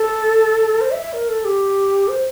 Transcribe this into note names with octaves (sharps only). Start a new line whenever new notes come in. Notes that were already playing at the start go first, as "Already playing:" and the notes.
Already playing: A4
C5
E5
E5
A#4
A4
G4
C5